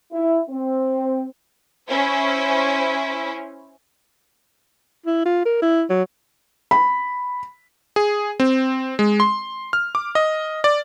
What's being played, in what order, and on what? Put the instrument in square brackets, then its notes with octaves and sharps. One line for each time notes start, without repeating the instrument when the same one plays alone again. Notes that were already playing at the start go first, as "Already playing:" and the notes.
[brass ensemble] E4
C4
[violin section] C#4 E4 C5
[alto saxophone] E4
F4
A#4
E4
F#3
[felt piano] B5
[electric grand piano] G#4
C4
G#3
C6
F6
D6
D#5
D5